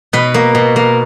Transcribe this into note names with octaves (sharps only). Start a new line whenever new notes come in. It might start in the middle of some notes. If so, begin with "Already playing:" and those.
B2 B4
A#3
B2
A#3